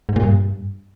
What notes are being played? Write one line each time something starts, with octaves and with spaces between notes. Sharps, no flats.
G#2
A#2
G2